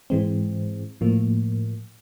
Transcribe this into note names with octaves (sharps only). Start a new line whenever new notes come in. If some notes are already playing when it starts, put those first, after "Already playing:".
G#2 E3 G#3 C4
A2 F3 A#3